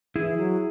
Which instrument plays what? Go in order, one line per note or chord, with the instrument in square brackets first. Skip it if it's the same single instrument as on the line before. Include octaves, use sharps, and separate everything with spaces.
[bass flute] E3 [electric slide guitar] E4 G#4
[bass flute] F#3